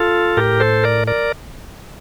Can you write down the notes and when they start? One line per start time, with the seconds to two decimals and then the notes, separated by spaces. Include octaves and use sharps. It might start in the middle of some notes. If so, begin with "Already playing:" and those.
Already playing: F4 A4
0.37 A2 G4 A#4
0.60 A4 C5
0.83 A#4 D5
1.07 A#4 D5